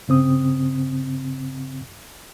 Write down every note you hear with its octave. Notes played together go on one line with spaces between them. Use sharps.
G2 C#3 C4 D#6